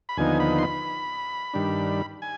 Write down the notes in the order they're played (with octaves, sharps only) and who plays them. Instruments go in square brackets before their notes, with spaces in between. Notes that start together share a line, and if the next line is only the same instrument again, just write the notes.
[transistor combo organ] B5
D#2 D3 F3 B3 D#4 G#5
B5
C6
B5
G2 D#3 G3 D4
G#5